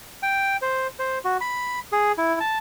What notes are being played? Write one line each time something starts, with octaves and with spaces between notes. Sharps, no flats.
G5
C5
C5
F#4
B5
G#4
E4
A5